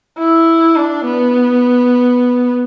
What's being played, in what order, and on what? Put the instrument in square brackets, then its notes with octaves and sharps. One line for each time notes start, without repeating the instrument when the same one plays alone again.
[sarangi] E4
D4
B3